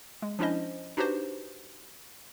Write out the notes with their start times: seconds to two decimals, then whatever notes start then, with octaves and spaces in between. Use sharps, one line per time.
0.22 G#3
0.39 F3 C#4 D4 E4 C5 D#5
0.97 D4 D#4 F#4 G4 B4 C5